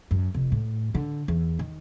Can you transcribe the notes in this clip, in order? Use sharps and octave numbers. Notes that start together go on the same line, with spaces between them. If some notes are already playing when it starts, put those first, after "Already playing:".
F#2
F1
A2
D3
E2
D#3